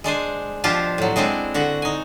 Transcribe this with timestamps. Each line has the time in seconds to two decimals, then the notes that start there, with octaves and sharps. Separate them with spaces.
0.04 G#3 D4 C5 G#5
0.64 B2 F3 D4 F4 G4 C5
0.98 A2 F#3
1.16 G#3 C4 D4 E4 C5
1.54 D3 F#4 F#5
1.82 D#4 G#5